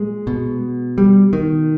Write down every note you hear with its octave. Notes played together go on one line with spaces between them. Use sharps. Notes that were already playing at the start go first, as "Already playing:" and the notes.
Already playing: A#2 G#3
B2
G3
D#3